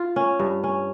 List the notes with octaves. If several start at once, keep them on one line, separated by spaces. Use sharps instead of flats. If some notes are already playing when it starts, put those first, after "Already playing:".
Already playing: F4
C#4
G2
C#4